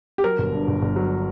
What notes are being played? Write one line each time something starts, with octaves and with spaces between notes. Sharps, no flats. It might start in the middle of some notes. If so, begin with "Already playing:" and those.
G4
F#3 A#4
G1
G2
G1
G1
F#3